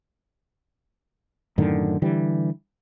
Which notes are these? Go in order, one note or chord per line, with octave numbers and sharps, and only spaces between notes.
F#2 A2 D3 D#3
D3 E3 G3